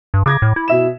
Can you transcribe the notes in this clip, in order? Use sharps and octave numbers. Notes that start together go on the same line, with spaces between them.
G2
C#3 D6 G#6 A#6
A2
E4
B2 E5 E7